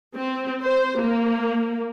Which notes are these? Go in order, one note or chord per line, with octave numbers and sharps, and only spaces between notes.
C4
C5
A#3